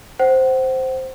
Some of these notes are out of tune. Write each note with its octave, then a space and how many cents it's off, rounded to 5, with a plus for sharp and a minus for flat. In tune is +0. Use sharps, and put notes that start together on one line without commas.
C5 +0 F#5 +30